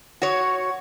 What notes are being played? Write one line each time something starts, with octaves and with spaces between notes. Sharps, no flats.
F#4 C#5